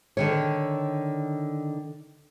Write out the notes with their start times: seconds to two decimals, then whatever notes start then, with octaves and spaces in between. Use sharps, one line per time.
0.17 D3 D#3 C#5